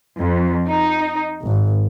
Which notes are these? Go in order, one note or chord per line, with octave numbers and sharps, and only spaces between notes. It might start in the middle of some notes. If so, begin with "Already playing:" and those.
F2
D#4
G#1